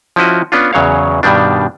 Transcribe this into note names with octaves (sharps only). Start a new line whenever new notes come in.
F3 C#4 E4 F#4 D#5
B3 C#4 D4 F4
E2 C#3 F#3 C#5 F5
G2 B2 D#3 G3 D4